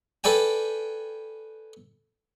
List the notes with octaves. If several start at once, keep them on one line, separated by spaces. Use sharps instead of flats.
A4 B4 D5 G5 G#5